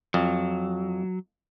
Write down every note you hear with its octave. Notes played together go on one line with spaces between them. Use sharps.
F2 F#3